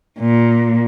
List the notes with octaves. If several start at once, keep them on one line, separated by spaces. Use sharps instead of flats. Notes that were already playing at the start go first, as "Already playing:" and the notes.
A#2